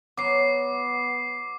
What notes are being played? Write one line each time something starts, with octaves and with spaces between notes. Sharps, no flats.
F#3 B3 D6 C7